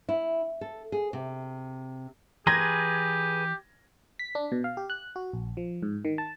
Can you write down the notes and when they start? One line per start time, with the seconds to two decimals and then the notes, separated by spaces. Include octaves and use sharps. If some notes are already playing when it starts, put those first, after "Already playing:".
0.09 E4
0.61 A4
0.92 G#4
1.13 C3
2.47 E3 G4 G#4 B4 A#5 C6 G#6 A#6
4.19 B6
4.35 D4
4.52 B2
4.64 F5
4.77 G4
4.90 F#6
5.16 F#4
5.33 A#1
5.57 F3
5.83 G#2
6.05 D#3
6.18 A5